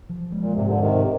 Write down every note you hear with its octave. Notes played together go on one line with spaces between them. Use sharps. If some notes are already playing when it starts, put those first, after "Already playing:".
F3
G#3
A#2
G#2 C3
D3
G#2 C3 D#3